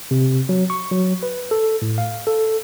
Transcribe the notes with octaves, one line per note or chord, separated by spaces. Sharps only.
C3
F#3
C#6
F#3
B4
A4
A2
F5
A4